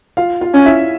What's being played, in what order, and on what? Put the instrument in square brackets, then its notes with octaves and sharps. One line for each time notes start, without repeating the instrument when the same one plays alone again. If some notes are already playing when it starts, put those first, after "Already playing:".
[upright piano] F4 F5
F4 F5
[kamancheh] C#4
[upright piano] E4 E5